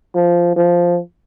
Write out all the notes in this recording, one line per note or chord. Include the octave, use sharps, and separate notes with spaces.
F3
F3